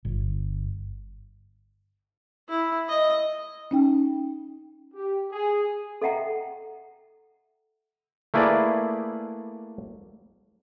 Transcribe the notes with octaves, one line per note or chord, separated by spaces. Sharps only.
G1
E4
D#5
C#4 D#4 G5
G4
G#4
A4 D#5 E5 F#5 G5 A#5
A3 A#3 E4 G#4 B4 D5